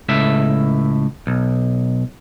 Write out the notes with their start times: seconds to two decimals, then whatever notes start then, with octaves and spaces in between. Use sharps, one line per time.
0.09 C#2 A2 E5
1.27 B1